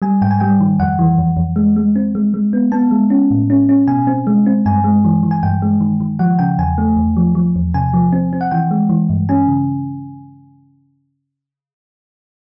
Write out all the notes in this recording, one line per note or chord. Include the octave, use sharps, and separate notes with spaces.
G3 G#5
G#2 G5
G#5
G3 G5
D#3
F2 F#5
E3
F2
F2
G#3
G#3
C4
G#3
G#3
B3
B3 A5
G#3
C#4
A2
C#4
C#4
B2 G#5
C4
G#3
C4
G2 G#5
G#3
E3
E3
G#5
G2 G5
G#3
D#3
D#3
F3 F#5
C#3 G5
E2 G#5
A3
E2
F3
F3
E2
C3 G#5
F3
C4
C4
F#5
E3 G5
G#3
E3
G2
C#4 G#5
C#3